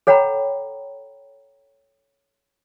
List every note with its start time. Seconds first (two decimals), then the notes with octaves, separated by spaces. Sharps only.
0.07 A4 C#5 F#5 G5 A#5 B5